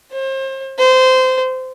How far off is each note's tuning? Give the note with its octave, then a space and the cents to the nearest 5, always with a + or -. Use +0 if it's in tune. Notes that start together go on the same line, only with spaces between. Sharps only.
C5 +35
C5 -20